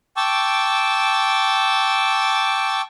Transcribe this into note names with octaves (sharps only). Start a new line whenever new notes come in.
G5 A5 C#6 D6 E6